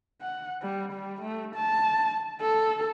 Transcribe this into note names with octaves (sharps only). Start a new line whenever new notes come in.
F#5
G3
G3
A3
A5
A4